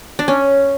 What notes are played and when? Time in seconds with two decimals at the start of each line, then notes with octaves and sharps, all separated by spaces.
0.19 D4
0.28 C#4